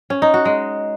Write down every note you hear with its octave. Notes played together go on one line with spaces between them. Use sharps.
C#4
D#4
F#4
G#3